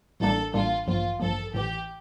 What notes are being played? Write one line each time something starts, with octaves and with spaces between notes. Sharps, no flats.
A1 A2 G3 A#3 D4 A4
A1 A2 G3 A#3 D4 F4
A1 G2 F3 A#3 F4
A1 G2 F3 A#3 A4
A1 A2 E3 G4